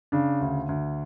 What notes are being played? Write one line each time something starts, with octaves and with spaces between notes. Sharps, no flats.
C#3 D4
D2
D2